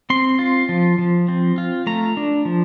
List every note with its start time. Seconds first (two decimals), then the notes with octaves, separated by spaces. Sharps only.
0.10 C4 C6
0.39 F4
0.69 F3
0.98 F3
1.28 C4
1.58 F4
1.87 A3 A#5
2.17 D4
2.45 F3